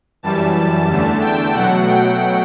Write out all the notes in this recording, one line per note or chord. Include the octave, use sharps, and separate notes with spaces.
F#2 E3 G3 A5
A5
E2 D3 A3
G5
B2 F#3 A3 F#5
G5